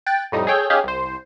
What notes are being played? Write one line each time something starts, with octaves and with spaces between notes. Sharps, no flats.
G5 F#6 A6
F2 A2 G3 D#4 D#6
G#4 A4 C#5 G5
C#4 D#4 G4 G#4 F5
C2 C5